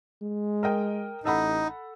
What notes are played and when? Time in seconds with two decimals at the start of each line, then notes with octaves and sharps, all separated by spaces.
0.23 G#3
0.63 A#4 D#5 G5
1.25 A1 D#4 A4 F#5 B5